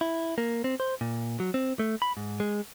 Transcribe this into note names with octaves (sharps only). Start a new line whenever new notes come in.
E4
A#3
C4
C5
A#2
F#3
C4
A3
B5
G#2
G#3